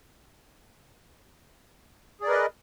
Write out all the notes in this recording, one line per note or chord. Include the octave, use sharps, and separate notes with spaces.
G#4 A#4 B4 D5 D#5